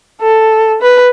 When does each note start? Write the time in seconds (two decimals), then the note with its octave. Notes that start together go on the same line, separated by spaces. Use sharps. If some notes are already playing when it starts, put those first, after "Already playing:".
0.21 A4
0.82 B4